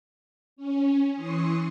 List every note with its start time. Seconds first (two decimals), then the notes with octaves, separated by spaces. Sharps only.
0.56 C#4
1.15 E3 C6 C#6 D#6